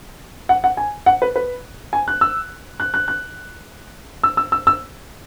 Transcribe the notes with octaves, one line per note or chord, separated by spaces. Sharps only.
F#5
F#5
G#5
F#5
B4
B4
G#5
F#6
E6
F#6
F#6
F#6
E6
E6
E6
E6